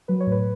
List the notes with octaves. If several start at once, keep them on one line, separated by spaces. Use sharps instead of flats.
F#3 B4
C#5
A2 B4